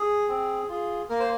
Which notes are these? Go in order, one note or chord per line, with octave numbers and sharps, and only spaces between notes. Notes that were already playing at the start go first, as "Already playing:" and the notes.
Already playing: G#4
C4
F4 G#4
A#3 A#4
C5